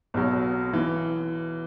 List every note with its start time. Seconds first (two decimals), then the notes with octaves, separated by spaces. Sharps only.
0.14 B1 B2 F#3
0.73 E3